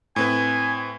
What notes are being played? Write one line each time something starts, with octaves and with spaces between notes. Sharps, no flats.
A2 C4 B4 G#5